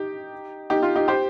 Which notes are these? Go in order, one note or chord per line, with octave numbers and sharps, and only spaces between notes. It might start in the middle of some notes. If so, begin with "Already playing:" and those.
Already playing: D#4 G4
D#4 G4
F4
D#4 G4
G4 C5